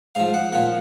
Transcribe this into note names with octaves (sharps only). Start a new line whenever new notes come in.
G#2 F3 F5
F#5
A#2 F3 F#5